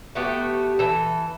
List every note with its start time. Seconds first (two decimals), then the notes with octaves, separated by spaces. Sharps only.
0.15 A3 B3 F#4 G4
0.79 E3 A4